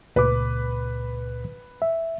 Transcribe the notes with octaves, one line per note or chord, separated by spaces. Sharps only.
C#2 A#2 B4 D6
E5